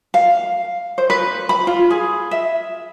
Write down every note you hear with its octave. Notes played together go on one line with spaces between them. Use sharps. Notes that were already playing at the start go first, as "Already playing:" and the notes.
F5
C5
B4
B5
F4
G#4
E5